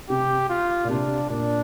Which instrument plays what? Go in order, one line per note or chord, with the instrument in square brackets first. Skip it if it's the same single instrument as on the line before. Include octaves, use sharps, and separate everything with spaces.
[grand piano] C3 [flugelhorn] G4
[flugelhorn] F4
[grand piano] A#2
[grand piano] C3 [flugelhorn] D4
[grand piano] A#2 [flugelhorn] D4